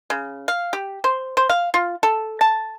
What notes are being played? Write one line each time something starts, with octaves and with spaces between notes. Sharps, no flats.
C#3
F5
G4
C5
C5
F5
F4
A4
A5